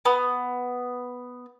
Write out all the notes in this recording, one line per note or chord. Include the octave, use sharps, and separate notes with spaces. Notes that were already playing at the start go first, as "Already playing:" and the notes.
B3